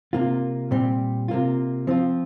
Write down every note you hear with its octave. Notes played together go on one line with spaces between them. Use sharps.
C3 A#3 F4
A#2 G3 C4 G4
C3 A#3 F4
F3 C4 F4